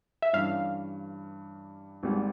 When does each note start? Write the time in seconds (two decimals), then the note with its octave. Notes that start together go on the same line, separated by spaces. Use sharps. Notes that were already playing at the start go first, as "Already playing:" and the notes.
0.22 E5
0.33 G2 E3 G3 C#4 F5
2.03 G#1 G#2 G3